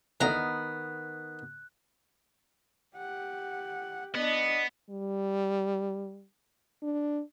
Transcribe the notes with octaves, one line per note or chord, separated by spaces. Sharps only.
D2 D#3 E3 B3 A#5 F#6
G4 F#5
B3 D4 D#5
G3
D4